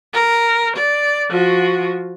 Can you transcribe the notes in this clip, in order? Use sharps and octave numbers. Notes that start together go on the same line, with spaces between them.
A#4
D5
F3 F#4